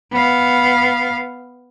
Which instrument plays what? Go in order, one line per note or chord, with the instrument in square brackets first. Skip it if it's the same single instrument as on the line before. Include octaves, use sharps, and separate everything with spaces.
[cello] B3 F5